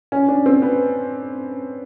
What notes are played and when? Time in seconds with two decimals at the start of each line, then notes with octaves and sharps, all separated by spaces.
0.12 C#4
0.28 D4
0.46 C4
0.62 B3